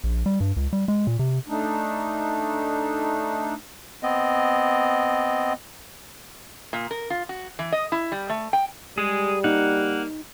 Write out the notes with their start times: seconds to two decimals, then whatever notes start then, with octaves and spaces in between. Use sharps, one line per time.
0.04 A#1
0.26 G3
0.40 G2
0.56 C#2
0.73 G3
0.88 G#3
1.07 A#2
1.19 C3
1.48 A3 D4 D#4
4.03 B3 C4 D#5
6.73 A#2
6.91 A#4
7.10 F4
7.29 F#4
7.59 E3
7.72 D#5
7.92 E4
8.12 G3
8.29 A3
8.53 G5
8.98 G3 G#3 G#4
9.44 A#3 D#4 F#5